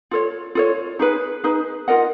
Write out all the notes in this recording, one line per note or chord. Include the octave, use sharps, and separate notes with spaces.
F4 A4 C#5
F4 A4 C#5
D#4 G#4 B4
D#4 G#4 B4
F4 A#4 D#5 F#5